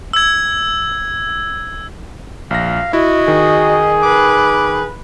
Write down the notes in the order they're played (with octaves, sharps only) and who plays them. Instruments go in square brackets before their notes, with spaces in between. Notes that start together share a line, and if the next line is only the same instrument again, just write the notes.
[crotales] E6 G#6
[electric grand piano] A#1 A#6 [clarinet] F5
[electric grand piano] E4 [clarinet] F#4 [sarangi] D#5
[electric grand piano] D#3 [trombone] G#4
[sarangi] B4 [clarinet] D6